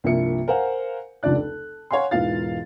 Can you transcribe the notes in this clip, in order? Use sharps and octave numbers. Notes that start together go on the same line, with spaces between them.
C2 G2 F3 A#3 E5 C#7
A#4 C5 F5 F#5 G#5
F1 C#2 D4 F4 D5 F#6
A4
C#5 F5 F#5 G#5 C6
E1 G#2 E3 F4 F5 A6